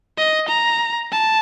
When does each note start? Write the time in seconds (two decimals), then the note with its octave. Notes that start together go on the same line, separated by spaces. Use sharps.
0.17 D#5
0.48 A#5
1.12 A5